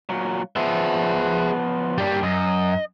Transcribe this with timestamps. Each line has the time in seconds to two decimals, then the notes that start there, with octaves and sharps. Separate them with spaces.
0.09 A#2 F#3
0.56 F3 B3 G#4 E5
1.98 G3 A#3 D4 G4
2.23 F#2 D#5